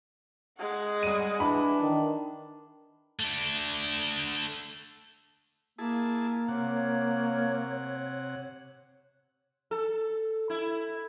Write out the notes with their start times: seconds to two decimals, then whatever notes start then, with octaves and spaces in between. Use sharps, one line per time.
0.59 G#3 F#5
1.03 G3 D#6 D#7
1.40 E3 D4 B5
1.82 D#3
3.20 A3 D4
5.79 A#3 E4 G#4 A5
6.48 C3 C#5 F#5
9.71 A4
10.50 E4